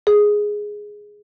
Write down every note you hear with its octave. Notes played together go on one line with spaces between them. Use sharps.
G#4